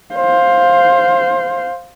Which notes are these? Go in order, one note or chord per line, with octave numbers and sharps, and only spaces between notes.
C5 F5